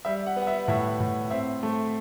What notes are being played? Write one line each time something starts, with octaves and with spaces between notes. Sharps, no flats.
G3 E5
F#5
B3
F#5
E5
A2 E5
A2
C4 E5
A3